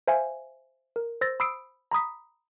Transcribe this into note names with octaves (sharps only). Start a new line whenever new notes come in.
C5 E5 F5 G#5
A#4
C5 E6 A6 A#6
B5 D#6 E6 C7 D7
A#5 B5 D#6 B6